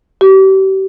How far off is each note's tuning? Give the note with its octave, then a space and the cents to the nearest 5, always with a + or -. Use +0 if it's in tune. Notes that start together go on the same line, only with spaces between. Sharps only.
G4 -35